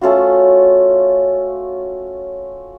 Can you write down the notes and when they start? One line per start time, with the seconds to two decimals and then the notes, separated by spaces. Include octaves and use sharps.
0.01 A3 C#4 F4 F#4